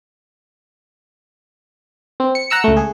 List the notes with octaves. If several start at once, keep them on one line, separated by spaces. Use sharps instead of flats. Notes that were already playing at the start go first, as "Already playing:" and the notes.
C4
C#7
F#5 A#5 E6 C#7
C#2 A3
G#4